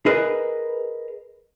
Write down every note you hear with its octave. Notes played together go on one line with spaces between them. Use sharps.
G#4 A#4 B4 D#5